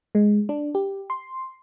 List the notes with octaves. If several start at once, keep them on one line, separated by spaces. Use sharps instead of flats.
G#3
D4
G4
C6